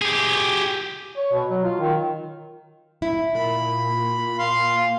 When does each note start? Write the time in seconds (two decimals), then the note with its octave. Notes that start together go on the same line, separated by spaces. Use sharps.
0.02 G4 G#4
1.16 C#5
1.32 B2
1.49 F#3
1.64 F4
1.80 D#3
3.02 E4
3.34 A#2 B5
4.38 F5 C6